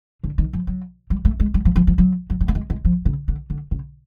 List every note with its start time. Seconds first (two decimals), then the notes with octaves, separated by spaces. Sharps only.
0.24 D3
0.38 D#3
0.53 F3
0.67 F#3
1.10 G3
1.25 A3
1.40 G#3
1.54 G3
1.65 F3
1.76 F3
1.87 F3
1.98 F#3
2.30 F#3
2.41 G3
2.48 A3
2.55 G#3
2.70 G#3
2.85 F3
3.05 C#3
3.28 D3
3.50 D3
3.71 C#3